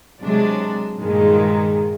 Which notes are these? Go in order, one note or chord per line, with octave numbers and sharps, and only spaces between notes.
C3 F#3 G#3 D4
G2 A#2 D#3 G#3